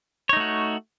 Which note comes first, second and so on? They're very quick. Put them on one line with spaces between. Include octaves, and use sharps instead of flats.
C#5 D#4 A3 F#4